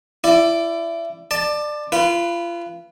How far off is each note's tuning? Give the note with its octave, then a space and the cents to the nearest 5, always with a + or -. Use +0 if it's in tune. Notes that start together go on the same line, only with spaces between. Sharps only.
E4 +25 D5 +0
D5 +25 A5 +0
F4 -30 B4 +0